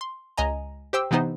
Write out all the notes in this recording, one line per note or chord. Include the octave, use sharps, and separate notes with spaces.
C6
C#2 D#5 G#5 A#5
G4 C5 G5 E6
C3 E3 B3 D#4 C5